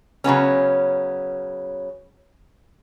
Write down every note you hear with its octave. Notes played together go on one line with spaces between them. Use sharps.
C#3 F#3 B3 C#4